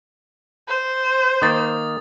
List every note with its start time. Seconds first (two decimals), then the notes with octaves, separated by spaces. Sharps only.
0.68 C5
1.42 D#3 A#3 D#6 A6